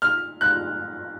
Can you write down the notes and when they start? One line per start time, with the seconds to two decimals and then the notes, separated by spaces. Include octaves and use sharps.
0.02 F6
0.41 F#6